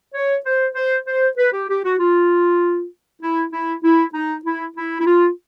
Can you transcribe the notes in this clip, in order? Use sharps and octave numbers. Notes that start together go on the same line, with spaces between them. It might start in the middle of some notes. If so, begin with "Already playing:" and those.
C#5
C5
C5
C5
B4
G4
G4
F#4
F4
E4
E4
E4
D#4
E4
E4
E4
F4